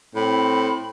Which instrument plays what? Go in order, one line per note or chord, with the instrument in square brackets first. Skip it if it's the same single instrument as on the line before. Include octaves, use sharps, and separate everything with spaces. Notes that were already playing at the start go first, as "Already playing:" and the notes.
[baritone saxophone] A2 [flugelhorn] C4 [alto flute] B5